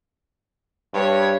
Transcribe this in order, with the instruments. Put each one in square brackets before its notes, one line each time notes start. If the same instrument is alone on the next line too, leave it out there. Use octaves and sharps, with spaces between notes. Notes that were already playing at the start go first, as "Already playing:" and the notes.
[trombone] G2 [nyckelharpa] C#5